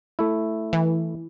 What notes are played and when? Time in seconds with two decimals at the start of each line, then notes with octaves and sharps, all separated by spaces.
0.19 A3 E4
0.73 E3